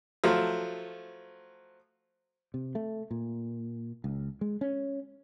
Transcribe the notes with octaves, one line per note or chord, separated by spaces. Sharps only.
F3 F#3 A3
C3
A3
A#2
C#2
G#3
C#4